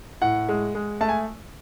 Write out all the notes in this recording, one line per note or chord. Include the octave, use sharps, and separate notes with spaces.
A2 F#5
G#3
G#3
A3 A5
G#5